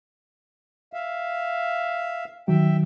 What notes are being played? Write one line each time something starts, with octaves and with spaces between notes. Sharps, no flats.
E5 F5
D#3 F#3 E5 G5